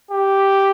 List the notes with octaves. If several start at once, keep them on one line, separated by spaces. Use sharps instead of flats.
G4